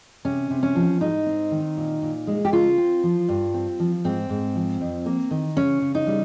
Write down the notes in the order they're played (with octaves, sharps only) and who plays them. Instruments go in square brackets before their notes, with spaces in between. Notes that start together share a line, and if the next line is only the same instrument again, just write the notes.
[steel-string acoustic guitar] C3 C#4
C3
C#4
F3
G#2 D#4
C4
D#3
A#2
A#2
G#3
G4
C#3 F4
C4
F3
G2
C4
F3
G#2 C4
G#2
F3
F2
A#3
D#3
C#3 C#4
C#3
D#4
G3